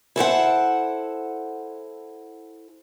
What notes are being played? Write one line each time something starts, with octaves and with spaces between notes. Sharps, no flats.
E4 A4 C5 F#5